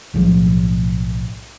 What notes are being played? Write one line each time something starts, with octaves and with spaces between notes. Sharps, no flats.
B1 A2 F3